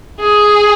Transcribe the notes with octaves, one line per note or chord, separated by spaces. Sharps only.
G#4